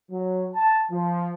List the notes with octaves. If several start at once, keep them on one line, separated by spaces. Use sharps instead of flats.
F#3
A5
F3